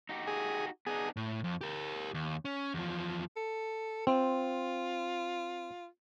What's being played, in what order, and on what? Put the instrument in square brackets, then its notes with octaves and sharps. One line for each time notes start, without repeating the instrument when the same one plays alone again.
[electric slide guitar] D#4 F#4 G4
[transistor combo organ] G#4
[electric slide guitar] B3 D4 D#4 [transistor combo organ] G#4
[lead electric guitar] A2
F2
G4 A#4
D#2
C#4
E2 F3
[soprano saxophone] A4
[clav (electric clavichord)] C4 [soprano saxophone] F4